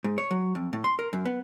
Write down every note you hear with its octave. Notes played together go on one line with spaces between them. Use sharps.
G#2
C#5
F#3
F2
A2
C6
A#4
F#2
B3